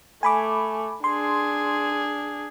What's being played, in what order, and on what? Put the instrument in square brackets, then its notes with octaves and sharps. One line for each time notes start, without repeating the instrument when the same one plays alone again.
[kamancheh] A3 [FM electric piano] G#5 B5 D6
[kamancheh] D4 G#4 [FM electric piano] C6